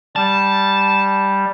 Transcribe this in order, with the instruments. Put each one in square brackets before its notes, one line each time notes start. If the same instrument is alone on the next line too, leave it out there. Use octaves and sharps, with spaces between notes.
[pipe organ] G3 [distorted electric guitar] A5